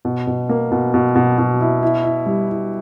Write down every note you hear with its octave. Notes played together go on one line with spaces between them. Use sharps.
B2
B2
A#3
B2
B2
B2
B2
E4
E4
E4
G3
E4